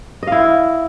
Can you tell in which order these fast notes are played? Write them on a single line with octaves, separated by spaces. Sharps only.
D#5 F5 E4